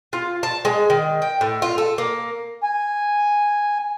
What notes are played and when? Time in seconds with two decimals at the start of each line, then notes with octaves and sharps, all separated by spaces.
0.13 F4
0.43 A5
0.65 G#3
0.90 D#3
1.22 G5
1.41 A2
1.62 F4
1.78 A4
1.98 A#3
2.63 G#5